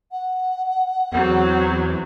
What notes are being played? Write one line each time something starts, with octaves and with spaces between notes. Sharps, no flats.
F#5
E2 F#3 C4